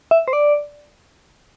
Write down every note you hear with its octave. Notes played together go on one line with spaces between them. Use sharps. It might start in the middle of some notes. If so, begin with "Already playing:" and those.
E5
C5
D5